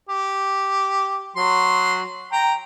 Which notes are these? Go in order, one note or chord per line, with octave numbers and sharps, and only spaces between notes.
G4
F#3 C6
G5 A#5